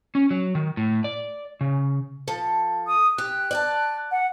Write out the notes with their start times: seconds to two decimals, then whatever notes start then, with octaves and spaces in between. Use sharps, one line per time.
0.15 C#4
0.31 F#3
0.55 D#3
0.77 A2
1.04 D5
1.61 C#3
2.28 F3 A4
2.87 D#6
3.18 G4 F#6
3.51 D5 G5 A5
4.11 F#5